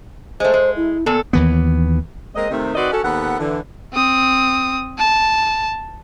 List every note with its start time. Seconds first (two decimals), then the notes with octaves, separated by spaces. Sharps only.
0.40 G#3 A3 C5
0.54 G#3
0.76 E4
1.06 A#2 B3 A4
1.33 D#2 E3 B3
2.36 G#3 A#3 C4 D#5
2.51 C3 D#3 A3
2.75 D#3 C4 F#4 B4 D5 D#5
2.91 C#4 F#4 A4
3.04 D#2 B3 A4 F#5
3.39 D3 E3
3.93 C4 D#6
4.98 A5